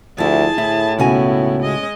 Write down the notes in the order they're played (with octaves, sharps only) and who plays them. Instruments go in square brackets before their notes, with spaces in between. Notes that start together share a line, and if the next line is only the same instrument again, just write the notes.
[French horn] D2 [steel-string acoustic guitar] F3 E4 [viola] G#4 A5
[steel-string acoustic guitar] D2 [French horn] A2 [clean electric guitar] E4
[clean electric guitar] C#2 F#4 [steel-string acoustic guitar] B2 C#4 G#5 [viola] B3 E4
[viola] G#3 D#5